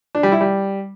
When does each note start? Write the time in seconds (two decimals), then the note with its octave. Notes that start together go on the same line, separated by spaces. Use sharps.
0.15 D4
0.23 G3
0.32 E4
0.41 G3